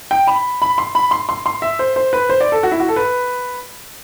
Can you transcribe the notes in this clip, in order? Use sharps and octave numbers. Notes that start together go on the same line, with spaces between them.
G5
B5
B5
C6
B5
C6
C6
C6
E5
C5
C5
B4
C5
D5
A4
F#4
E4
F#4
A4
B4